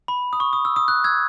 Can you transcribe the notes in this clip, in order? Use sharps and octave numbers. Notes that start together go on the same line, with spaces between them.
B5
D#6
C#6
D#6
E6
D#6
F#6
E6 G#6